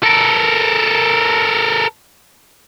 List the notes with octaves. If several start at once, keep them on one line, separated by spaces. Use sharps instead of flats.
A4 A#4